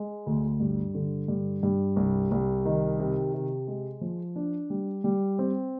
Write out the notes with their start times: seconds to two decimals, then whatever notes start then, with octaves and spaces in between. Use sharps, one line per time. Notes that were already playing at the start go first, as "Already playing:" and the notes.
Already playing: G#3
0.26 D2
0.60 G2
0.95 D3
1.28 G2
1.63 G2
1.96 C2
2.31 C2
2.65 D#3
2.99 C3
3.34 C3
3.67 G#3
4.01 F3
4.36 D4
4.70 G3
5.04 G3
5.39 C4